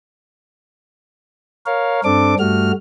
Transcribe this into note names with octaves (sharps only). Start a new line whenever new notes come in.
A#4 C#5 F5
G2 C4 D4 A4 D6
G2 G3 A3 F#4 F6